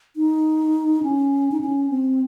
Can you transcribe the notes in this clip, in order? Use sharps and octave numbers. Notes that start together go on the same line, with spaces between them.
D#4
C#4
D#4
C#4
C4